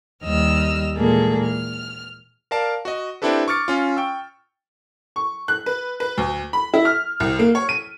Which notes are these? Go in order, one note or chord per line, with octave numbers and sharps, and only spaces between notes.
D#2 G3 D#5 E6 F6
A#2 E3 G#3 A#3 G#4 A4
F6
A#4 D5 F5 A5
F#4 D#5
C4 D4 E4 G4 A4 B4
C#6 D6 F6 A6 C#7
C#4 F4
G5 C#6 E6
C#6
F#6
B4
B4
D2
B5
E4
F6
C2
A#3
C#5
D#7